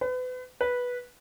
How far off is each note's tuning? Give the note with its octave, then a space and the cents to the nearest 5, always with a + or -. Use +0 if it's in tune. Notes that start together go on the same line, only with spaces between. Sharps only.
B4 +35
B4 -10